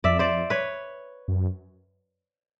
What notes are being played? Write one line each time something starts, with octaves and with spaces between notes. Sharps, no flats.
F2 D5 E5
C5 D5
B4 C#5
F#2